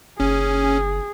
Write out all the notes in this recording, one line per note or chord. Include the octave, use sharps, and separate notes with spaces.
F#1 C#4 G#4